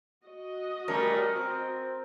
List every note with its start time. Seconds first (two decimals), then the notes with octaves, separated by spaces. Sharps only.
0.24 F#4 D#5
0.88 G3 A3 C#4 A#4
1.36 C4